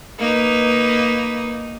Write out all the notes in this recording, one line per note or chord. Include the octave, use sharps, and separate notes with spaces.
A#3 D#4 B4